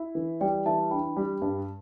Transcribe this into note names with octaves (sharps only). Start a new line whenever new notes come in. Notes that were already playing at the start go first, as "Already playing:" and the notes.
Already playing: E4
E3
G3 D5 G5
E3 E5 A5
D4 G5 B5
G3
G2